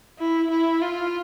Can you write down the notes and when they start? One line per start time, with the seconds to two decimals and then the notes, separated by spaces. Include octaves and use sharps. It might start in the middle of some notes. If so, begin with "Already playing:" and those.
0.19 E4
0.50 E4
0.82 F4